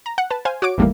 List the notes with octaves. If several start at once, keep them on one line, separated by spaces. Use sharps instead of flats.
A#5
F#5
B4 A5
C5 F5 G#5
F#4 C#5 D6 D7
G#1 E2 G3 A3 A#3